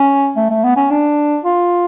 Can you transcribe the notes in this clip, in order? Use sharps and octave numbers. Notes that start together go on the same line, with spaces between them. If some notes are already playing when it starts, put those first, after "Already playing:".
Already playing: C#4
A3
A3
B3
C#4
D4
F4